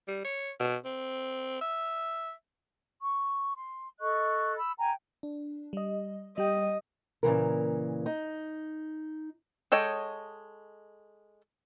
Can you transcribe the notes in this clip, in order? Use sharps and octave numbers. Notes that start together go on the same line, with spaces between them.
G3
C#5
B2
C4
E5
C#6
C6
A4 D#5 C#6 F#6
B5 E6
G5 G#5 A#5
D4
G3 D#5
G3 G4 D#5 G5
A#2 C#3 E3 A#4
D#4
G#3 A4 C#5 D#5 G5